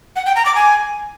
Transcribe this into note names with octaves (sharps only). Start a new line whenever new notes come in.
F#5
G5
A#5
D6
G#5